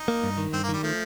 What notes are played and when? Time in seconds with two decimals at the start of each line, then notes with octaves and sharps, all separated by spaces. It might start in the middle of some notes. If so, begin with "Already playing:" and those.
Already playing: D#4
0.08 A#3
0.24 G2
0.38 D#3
0.53 G2 C4
0.63 A#3
0.69 D#3 G3
0.83 F3 A3